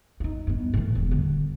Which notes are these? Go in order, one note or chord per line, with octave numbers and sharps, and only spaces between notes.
D#4 F4
G2 B3
A2 E3
E1
D3 G3